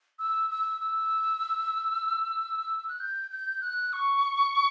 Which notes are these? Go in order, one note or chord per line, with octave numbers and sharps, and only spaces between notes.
E6
E6
E6
F#6
G6
G6
F#6
C#6